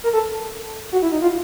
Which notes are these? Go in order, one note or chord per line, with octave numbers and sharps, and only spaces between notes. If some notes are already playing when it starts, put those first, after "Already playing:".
A#4
A4
F#4
E4
D#4
F4